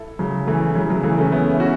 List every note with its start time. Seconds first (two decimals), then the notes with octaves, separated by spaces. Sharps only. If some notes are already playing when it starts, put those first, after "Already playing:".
Already playing: E4 A4
0.19 C#3 F#3
0.47 E3 A3
0.75 C#3 F#3
0.89 C#3 F#3
1.03 E3 A3
1.18 A3 C#4
1.32 B3 E4
1.53 E4
1.60 C#4 F#4